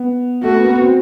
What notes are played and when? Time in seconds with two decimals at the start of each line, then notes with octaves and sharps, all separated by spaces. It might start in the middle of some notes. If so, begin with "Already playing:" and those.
Already playing: B3
0.43 A3 F#4
0.56 B3
0.64 A#3
0.69 B3
0.82 C4